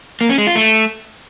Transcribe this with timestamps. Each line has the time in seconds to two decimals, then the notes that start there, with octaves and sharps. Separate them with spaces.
0.21 A#3
0.29 C#4
0.38 G#3
0.47 F4
0.55 A3